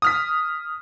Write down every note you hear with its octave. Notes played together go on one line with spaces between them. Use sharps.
D#6 F6 B6